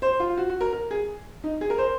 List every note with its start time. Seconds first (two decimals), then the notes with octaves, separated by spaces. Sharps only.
0.02 C5
0.20 F4
0.37 F#4
0.49 F#4
0.61 A#4
0.73 A#4
0.91 G#4
1.44 D#4
1.61 G#4
1.70 A#4
1.78 C5